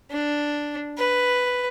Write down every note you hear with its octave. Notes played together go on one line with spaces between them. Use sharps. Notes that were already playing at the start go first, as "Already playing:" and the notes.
D4
B4